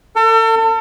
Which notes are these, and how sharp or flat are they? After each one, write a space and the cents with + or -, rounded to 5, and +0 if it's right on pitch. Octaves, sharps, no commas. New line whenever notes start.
A4 +40